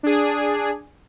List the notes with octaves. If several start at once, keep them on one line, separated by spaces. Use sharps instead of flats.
D4 G#4